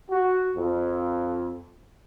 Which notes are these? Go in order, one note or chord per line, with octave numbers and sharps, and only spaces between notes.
F#4
F2